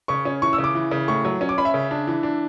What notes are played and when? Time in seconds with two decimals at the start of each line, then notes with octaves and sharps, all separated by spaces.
0.08 C#3 C#6
0.25 C#4
0.42 E3 C#6
0.53 E6
0.58 C#3
0.64 D6
0.75 E3
0.91 C#3
1.08 A2 C#6
1.25 F#3
1.41 C#4
1.49 D6
1.58 C#4 B5
1.65 E5
1.74 C#3
1.91 D4
2.07 E3
2.23 D4